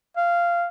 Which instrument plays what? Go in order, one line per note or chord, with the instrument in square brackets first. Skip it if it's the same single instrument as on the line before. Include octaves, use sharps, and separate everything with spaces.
[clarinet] F5